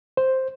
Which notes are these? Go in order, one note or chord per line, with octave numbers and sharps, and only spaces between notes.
C5